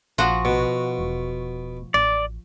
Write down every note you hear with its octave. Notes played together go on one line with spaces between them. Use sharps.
A#1 F3 F#4
B2
E1
A1 D5